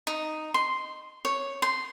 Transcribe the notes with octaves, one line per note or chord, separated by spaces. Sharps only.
D#4
C6
C#5
C6